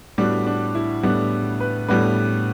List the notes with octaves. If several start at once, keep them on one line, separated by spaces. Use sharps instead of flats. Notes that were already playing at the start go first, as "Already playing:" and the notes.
A2 G3 B3 D4 F#4
D4
E4
A2 G3 B3 D4
B4
A2 G3 B3 D4 B4